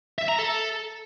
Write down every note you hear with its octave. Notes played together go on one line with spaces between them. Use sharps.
E5
A#5
A4